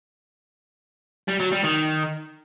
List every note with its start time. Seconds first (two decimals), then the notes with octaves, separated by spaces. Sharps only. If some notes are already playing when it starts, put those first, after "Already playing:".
1.28 G3
1.40 F#3
1.52 G3
1.64 D#3